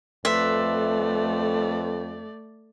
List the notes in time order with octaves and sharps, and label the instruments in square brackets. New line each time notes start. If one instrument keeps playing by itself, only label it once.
[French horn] F2 [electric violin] A3 D5 [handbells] B4 C6 [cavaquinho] E5